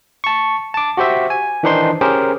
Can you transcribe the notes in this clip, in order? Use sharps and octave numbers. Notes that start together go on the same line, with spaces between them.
A5 C#6
A5 D6
F#4 G4 C5 E5
G#5
D#3 E3 D4 D#4 C5 C6
C#4 G4 G#4 A#4 C5